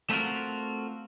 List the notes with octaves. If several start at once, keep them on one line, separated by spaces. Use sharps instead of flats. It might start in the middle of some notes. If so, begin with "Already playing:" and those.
A3 B3 C4 F4 F#4 A#4